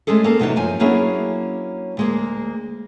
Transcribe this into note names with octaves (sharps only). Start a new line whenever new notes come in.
G#3 A3 C#4 G#4 A4
A#3 C4 G#4 A4
E2 C3 E3 F#3 D4 D#4
F#2 F3 G#5
F#3 A#3 C#4 D4 E4 G#4
D2 G#3 A#3